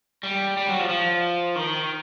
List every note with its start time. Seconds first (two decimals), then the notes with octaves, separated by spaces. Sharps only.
0.23 G3
0.57 G3
0.68 F#3
0.79 F3
0.89 F3
1.56 D#3